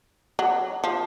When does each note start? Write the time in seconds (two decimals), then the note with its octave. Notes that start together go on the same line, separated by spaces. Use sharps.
0.39 F#3
0.84 F3